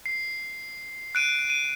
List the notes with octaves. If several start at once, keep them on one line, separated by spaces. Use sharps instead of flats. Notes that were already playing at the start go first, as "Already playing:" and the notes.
C7
F#6 D7 D#7
D7 D#7